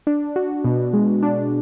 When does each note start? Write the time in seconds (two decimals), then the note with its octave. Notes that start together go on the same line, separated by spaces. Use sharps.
0.07 D4
0.36 F#4
0.64 B2
0.93 G#3
1.23 D4